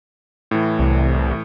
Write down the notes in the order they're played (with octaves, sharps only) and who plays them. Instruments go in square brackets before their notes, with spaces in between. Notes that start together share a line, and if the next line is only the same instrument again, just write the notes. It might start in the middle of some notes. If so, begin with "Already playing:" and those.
[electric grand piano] A2 E3
[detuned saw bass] C2